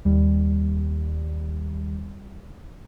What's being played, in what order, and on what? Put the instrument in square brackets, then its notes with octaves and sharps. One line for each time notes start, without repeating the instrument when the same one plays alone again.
[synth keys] D#2 G3